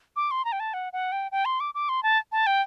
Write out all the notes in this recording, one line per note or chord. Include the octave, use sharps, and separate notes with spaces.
D6
C6
A#5
G5
A5
F#5
F#5
G5
G5
C6
D6
D6
C6
A5
A5
G5